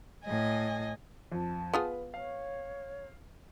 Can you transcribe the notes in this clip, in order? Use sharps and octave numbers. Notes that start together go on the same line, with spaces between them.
A2 D#5 G#5
F2 A5
B3 F4 G#4 B4
C#5 F5